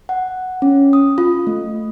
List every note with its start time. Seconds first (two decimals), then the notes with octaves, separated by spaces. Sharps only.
0.09 F#5
0.62 C#4
0.93 D#6
1.18 F4
1.47 A3